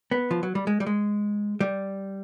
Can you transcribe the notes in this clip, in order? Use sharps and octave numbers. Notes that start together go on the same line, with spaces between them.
B3
F3
F#3
G3
G#3
G3
G#3
G3